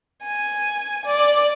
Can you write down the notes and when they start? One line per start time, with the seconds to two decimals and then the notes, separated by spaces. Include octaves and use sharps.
0.23 G#5
1.05 D5